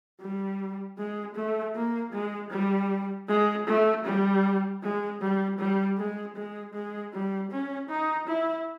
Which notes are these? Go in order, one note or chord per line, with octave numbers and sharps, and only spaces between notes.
G3
G#3
A3
A#3
G#3
G3
G#3
A3
G3
G#3
G3
G3
G#3
G#3
G#3
G3
C#4
D#4
E4